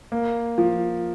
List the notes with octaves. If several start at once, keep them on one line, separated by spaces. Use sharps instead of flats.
A#3
F3